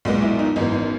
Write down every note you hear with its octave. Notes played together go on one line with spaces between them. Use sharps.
B1 A#2 G#3 B3
E4
D#4
G#1 F#2 E3 B3 D#4
D#4